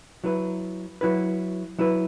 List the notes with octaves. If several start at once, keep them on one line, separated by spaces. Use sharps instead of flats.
F#3 E4 B4
F#3 E4 B4
F#3 E4 B4